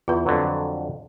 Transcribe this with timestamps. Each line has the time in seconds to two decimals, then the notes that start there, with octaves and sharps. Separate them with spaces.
0.08 E2 F4 B4
0.26 F2 D3 F#3